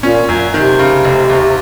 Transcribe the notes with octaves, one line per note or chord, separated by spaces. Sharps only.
A#2 C#4
F#2 A#2
C3 D#3
C#3
F1
D#2